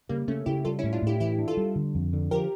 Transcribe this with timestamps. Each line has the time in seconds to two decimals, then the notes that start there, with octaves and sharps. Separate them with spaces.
0.09 C#3 G3 A#3
0.28 C#3 A3 C#4
0.46 C#3 E4 G4
0.65 G3 F4 A4
0.79 C#4 E4
0.83 A2
0.93 D4 F4
1.02 A2 E4 G4
1.20 E3 E4 G4
1.39 D4
1.48 F4 A4
1.57 G3
1.76 D3
1.95 F2
2.13 D3
2.31 F3 G4 A#4